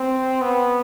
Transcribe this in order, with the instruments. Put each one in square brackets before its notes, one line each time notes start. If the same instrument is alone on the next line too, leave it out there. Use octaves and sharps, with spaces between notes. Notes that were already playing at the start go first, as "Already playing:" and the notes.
Already playing: [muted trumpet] C4
B3